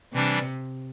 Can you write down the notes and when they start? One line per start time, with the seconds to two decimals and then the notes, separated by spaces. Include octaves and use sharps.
0.13 C3 E3 G3 D4